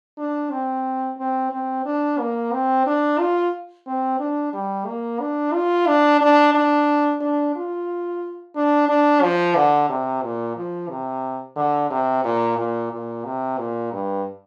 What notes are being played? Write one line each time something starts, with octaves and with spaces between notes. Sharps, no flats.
D4
C4
C4
C4
D4
A#3
C4
D4
F4
C4
D4
G3
A#3
D4
F4
D4
D4
D4
D4
F4
D4
D4
F3
D3
C3
A#2
F3
C3
D3
C3
A#2
A#2
A#2
C3
A#2
G2